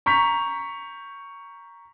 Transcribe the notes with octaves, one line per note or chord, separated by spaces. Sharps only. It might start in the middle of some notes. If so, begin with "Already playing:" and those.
A#5 C#6 G6 B6 F7